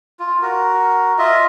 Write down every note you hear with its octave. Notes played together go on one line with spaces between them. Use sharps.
F4
F#4 A#4
F4 D#5 E5